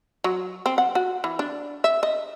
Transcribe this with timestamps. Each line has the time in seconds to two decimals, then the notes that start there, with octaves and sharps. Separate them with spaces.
0.24 F#3
0.66 C4
0.78 F#5
0.95 F#4
1.24 E3
1.39 D4
1.84 E5
2.03 D#5